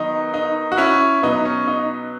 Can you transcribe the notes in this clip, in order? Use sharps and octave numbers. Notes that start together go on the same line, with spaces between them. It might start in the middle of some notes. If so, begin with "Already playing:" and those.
Already playing: D#3 F#3 B3 D#4
D#4
F#4
C#4 E4
B2 F#3 B3 D#4
C#4
D#4